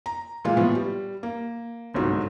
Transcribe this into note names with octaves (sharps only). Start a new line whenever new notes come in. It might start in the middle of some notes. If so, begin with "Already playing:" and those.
A#5
A#2 E3 G#3 F4
A2 F3 B3
G3
A#3
G1 C2 G#2 F#3